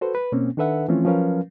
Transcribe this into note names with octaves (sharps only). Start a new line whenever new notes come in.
F#4 A4 B4 C5
B4
B2 A#3 C4 C#4
D#3 D4 A4 B4 E5 F#5
E3 F3 A3 C4 C#4 F4
F3 F#3 C#4 A#4 B4 F5